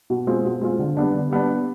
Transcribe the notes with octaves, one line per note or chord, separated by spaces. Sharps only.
B2
G#3 C4 F4
B2
G#3 C4 F4
D3
G3 B3 D4
D3
G3 B3 D4